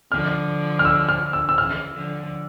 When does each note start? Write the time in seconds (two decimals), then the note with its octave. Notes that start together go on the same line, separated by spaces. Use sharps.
0.11 D3 F3 F6
0.79 F6
0.85 E6
1.09 F6
1.33 E6
1.49 E6
1.57 C#3 E3 F6
1.94 D3 F3